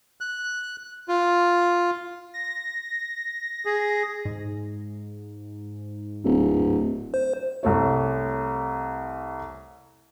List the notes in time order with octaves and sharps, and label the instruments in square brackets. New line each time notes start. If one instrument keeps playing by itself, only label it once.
[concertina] F#6
F4
[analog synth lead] A#6
[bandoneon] G#4
[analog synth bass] G#2
[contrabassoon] D1
[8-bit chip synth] C5
[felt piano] C2 A3 C#5